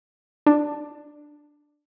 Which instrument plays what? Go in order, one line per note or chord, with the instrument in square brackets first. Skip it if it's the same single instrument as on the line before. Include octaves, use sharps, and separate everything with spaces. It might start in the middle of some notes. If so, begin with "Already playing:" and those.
[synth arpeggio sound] D4